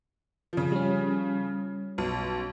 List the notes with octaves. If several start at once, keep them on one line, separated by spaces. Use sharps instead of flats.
C#3 F3
G3 C#4
B1